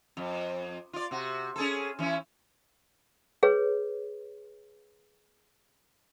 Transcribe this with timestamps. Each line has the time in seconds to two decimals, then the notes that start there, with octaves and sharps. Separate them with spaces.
0.17 F2
0.93 F4 D5
1.11 C3 F#4
1.56 C#4 G#4 A4
1.99 E3 C#4 E4
3.43 G#4 B4 C#5